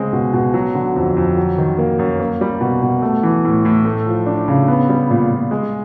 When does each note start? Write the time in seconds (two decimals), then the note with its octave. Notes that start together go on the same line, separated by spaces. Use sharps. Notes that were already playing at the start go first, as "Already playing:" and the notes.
Already playing: C#3 G#3 C4
0.13 B2
0.34 B2
0.54 F#3
0.75 D3
0.96 F2
1.17 F2
1.37 F#3
1.58 D#3
1.78 A#3
1.99 F#2
2.20 A#3
2.41 G3
2.61 B2
2.82 B2
3.02 A3
3.23 E3
3.45 A2
3.65 A2
3.85 A3
4.06 F3
4.26 D4
4.48 C#3
4.68 B3
4.89 G3
5.10 A#2
5.31 A#2
5.51 G#3